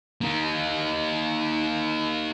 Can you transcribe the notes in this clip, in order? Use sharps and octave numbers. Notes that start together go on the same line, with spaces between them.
A#3 D#4